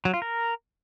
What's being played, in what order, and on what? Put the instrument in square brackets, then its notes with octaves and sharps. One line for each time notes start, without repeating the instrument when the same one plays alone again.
[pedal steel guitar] F#3
F4
A#4